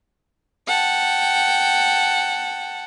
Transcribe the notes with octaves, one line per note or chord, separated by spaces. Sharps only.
F#5 G5 A5